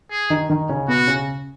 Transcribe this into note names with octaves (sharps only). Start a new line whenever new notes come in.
G#4
D#3 D#4
D#3 D#4
C#3 C#4
B2 B3 F#4
C#3 C#4